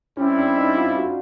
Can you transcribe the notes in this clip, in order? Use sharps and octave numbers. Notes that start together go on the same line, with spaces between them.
G3 C4 C#4 E4
D4
D#4
F4
F#4